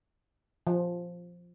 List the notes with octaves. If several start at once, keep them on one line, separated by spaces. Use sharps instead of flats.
F3